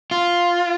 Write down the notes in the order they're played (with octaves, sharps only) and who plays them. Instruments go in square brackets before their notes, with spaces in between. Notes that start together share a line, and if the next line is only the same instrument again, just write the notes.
[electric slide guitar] F4